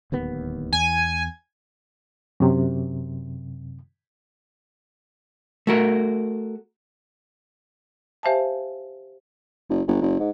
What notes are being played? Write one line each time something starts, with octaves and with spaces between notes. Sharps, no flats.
D1 D#2 B3
E2 G#5
F#2 C3
A3 F#4 A#4
G4 C5 E5 F5 G#5 A5
F#1
G1
F#1
G#2